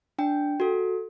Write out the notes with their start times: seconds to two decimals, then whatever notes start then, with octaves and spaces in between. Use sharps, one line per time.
0.18 D4 G5
0.60 F#4 A4